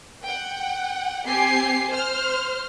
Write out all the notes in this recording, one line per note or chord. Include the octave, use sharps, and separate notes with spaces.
F#5 G5
C4 G4 G#5 C7
C5 F6